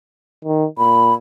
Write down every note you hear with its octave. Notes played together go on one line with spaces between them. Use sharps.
D#3
A#2 B5